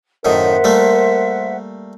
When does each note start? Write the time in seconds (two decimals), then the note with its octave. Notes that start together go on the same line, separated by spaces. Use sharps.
0.25 F#2 A2 D#3 A#4 C5 E5 F#5
0.64 G3 A3 A#3